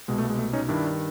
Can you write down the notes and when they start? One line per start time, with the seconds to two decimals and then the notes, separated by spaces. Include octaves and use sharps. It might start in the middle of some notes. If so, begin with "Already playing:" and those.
0.08 C2 B2 G#3
0.18 A3
0.29 G#3
0.39 A3
0.53 C#4 D#4
0.69 G2 D#3 D4 E4